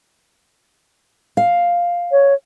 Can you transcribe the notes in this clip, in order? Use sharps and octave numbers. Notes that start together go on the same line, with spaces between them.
F5
C#5